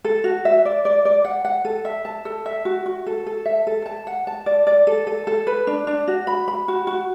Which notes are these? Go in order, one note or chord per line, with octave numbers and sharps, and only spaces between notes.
A4
F#4
E5
D5
D5
D5
F#5
F#5
A4
E5
A5
A4
E5
F#4
F#4
A4
A4
E5
A4
A5
F#5
A5
D5
D5
A4
A4
A4
B4
D4
D4
F#4
B5
B5
F#4
F#4